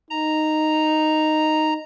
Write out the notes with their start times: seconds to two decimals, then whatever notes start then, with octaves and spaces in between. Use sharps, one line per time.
0.10 D#4 A#5